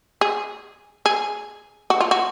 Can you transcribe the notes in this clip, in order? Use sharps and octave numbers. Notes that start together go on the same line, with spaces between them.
G#4
G#4
F#4
F4
F#4